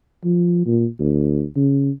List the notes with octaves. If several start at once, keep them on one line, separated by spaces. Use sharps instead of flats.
F3
A#2
D2
C#3